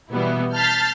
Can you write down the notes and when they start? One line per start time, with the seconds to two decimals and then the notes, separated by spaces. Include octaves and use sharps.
0.12 B2 E3 G3 B3 E4
0.54 A5 F6 G6 A6 B6 C7